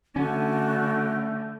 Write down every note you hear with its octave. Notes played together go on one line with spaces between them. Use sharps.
D3 A3 C#4 F#4